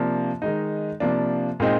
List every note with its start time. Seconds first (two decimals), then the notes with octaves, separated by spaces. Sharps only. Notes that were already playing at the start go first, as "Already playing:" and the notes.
Already playing: C3 F3 A#3 D4
0.42 D#3 G#3 D#4
1.00 C3 F3 A#3 D4
1.60 A#2 G#3 C4 D#4